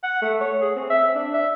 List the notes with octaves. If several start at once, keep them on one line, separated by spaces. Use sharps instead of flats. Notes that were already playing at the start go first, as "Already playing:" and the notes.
F#5
A3
C#5
G#4
C4
E5
C4
D4
E5